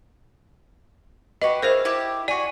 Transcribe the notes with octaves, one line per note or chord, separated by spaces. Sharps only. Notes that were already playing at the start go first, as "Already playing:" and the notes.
F#4 G4 B4 D#5
E4 G#4 A#4 C5 F5
E4 G4
F#4 D5 G#5